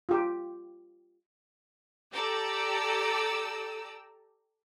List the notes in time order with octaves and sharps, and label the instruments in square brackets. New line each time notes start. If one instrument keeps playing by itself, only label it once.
[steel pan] F4 G4
[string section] G4 A4 D5 A#5 E6